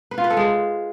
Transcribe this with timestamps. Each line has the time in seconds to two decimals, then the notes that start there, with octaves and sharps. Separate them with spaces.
0.11 B4
0.18 F4
0.24 B4
0.30 A4
0.37 G#3